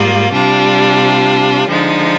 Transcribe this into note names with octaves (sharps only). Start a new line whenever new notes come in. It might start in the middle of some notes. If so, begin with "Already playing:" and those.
Already playing: G#2 G3 A#3 F4
C3 G3 D4 F4
D3 F3 G#3 D#4